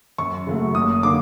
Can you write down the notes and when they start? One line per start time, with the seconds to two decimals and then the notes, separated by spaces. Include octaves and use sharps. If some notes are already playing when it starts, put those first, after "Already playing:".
0.18 F#2 C#6
0.47 C#3 F#3 A3
0.74 F#1 D#6
1.03 D3 F#3 A#3 D6